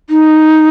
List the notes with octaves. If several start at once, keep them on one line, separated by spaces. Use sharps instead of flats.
D#4